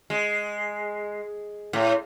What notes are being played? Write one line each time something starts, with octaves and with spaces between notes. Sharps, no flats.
G#3
A2